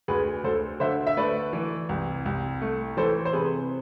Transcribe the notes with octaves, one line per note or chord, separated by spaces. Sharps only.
D2 G#4 B4
D2 A4 C5
D3 C5 E5
E5
A3 B4 D5
E3
C2
C2
A3
E3 A4 C5
C5
C3 G#4 B4